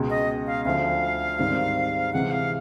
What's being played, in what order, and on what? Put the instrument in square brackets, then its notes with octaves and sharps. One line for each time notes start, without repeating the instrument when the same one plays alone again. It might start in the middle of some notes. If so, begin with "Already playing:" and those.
Already playing: [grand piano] C#2 B2 G#3
[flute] D#5
F5
[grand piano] D2 D3 F3 [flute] F5
[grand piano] G#2 D#3 G3 C4
[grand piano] C3 E3 G#3 [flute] F#5
[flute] F5